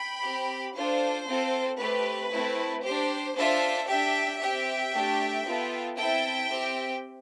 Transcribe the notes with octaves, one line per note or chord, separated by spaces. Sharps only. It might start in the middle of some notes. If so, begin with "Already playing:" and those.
Already playing: G5 B5
C4 G4
D4 F4 A4 C5
C4 F4 A4
A3 C4 G4 B4
A3 C4 E4
D4 G4 C5
D4 F4 A4 C5 E5
D4 G4 E5 G5
C4 G4 E5 G5
A3 D4 G4
B3 F4 A4
C4 E4 A4 E5 G5
C4 G4